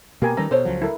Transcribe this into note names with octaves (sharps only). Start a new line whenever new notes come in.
B2 A#3 G4 A#4 G#5
D#3 G3 C#4 D#4 A4 B4 A#5
B2 A4 C5 C#5
C#2 F3 F#3
E4 A4 A#4